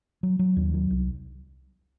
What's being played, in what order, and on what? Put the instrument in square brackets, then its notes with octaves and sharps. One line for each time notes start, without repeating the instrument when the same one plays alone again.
[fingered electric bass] F#3
F#3
D#2
F#3
C2